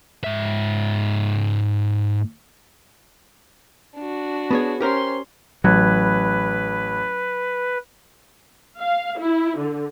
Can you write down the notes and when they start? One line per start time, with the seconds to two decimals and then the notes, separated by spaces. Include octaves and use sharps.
0.24 G#2 E5
3.96 D4 F#4
4.51 B3 G#4 C#5
4.80 C#4 G4 A#4 C5 C6
5.64 A1 F#3 B4 B5 F#6 G#6
8.81 F5
9.19 E4
9.58 D3